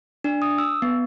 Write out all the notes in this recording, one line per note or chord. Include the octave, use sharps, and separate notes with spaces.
D4
D#6
E6
B3